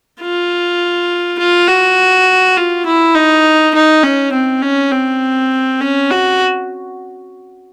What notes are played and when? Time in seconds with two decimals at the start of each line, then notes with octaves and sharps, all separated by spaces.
0.21 F4
1.39 F4
1.68 F#4
2.57 F4
2.86 E4
3.15 D#4
3.75 D#4
4.03 C#4
4.33 C4
4.62 C#4
4.91 C4
5.80 C#4
6.10 F#4